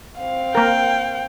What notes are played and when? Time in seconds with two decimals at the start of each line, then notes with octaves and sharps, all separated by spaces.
0.17 C4 F5
0.55 A#3 A#4 G5